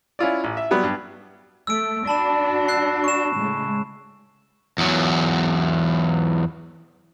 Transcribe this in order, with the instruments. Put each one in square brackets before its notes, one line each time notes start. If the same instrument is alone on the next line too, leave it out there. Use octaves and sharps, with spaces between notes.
[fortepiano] C#4 E4 F4 D5
A1
E5
F#3 G3 B3
G2
[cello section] A3 [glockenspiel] E6 D7
[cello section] D4 F#4 [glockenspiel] A5 B5 E7
[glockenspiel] E6 F#6 C7
C#6 E7
[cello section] A2 C#3 G#3
[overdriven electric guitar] E2 F#3